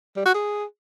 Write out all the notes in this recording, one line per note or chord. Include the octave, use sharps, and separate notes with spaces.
G3
F#4
G#4